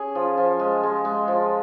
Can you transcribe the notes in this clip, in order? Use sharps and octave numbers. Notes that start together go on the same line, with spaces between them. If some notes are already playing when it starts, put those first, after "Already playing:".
Already playing: C#4 G#4
F3
F3
G#3
G#3
G#3
F3